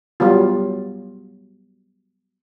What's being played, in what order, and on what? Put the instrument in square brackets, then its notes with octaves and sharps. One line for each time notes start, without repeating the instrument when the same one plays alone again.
[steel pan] F#3 G3 B3 F4